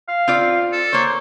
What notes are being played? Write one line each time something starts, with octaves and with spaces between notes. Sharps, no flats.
F5
C4 F4 D5
A4
A#3 C5 C#5